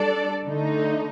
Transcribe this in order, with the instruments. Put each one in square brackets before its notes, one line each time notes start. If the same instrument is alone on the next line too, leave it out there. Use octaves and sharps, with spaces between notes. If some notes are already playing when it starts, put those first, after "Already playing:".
Already playing: [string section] G3 D4 A4 D5
D3 A3 D#4